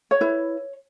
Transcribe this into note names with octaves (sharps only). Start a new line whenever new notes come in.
C#5
E4 B4